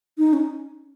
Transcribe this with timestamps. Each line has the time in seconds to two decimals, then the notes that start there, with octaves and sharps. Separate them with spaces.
0.18 D#4
0.33 C#4